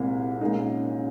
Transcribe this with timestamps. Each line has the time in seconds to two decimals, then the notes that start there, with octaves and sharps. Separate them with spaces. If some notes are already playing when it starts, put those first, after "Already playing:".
Already playing: C2 A#2 G#3 C4
0.41 A#2 G#3 C#4 D#4